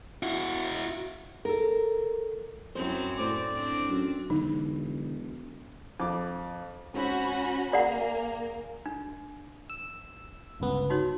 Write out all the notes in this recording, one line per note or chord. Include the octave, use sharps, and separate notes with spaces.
E4 F#4
A4 A#4
F#2 C4 E4 C5
A2 C5 D5
C4 D4
F#2
E1 D3 F#3 D#4
F2 D6
G#2 C4 C#4 F#4 B5
A#3 G#4 D5 F5 F#5 A#5
D4
E6
G1 C#2 B3
D#4 F#4 C#5